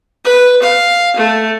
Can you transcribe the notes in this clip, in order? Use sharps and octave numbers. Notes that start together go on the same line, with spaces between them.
B4
F5
A3